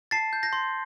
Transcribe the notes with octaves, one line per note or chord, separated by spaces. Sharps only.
A5 A6 C7
G6
G6 A#6
C6